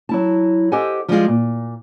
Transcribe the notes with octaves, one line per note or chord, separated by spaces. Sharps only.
F#3 E4 A5
G4 A4 C5 D#5 F#5 G#5
F3 G3 G#3 F4
A#2